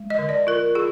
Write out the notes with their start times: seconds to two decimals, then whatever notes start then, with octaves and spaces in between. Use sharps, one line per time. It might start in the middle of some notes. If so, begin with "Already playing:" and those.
Already playing: G#3
0.10 D#5
0.19 D3
0.29 D5
0.47 F4 A#4
0.75 F4 G#4